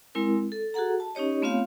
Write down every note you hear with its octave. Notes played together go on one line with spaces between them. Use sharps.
G#3 C4 E4 A#4
A4
F#4 G#4 A4 F#5 A#5
A5
C#4 D#4 G4 C#5 D#5
A3 B3 C4 F4 C#5 F5